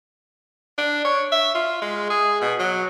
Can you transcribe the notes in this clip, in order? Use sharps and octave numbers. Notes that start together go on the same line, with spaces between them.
D4
C#5
E5
F4
G#3
G#4
B2
F#3